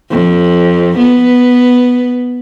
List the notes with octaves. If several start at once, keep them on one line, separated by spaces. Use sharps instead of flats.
F2
B3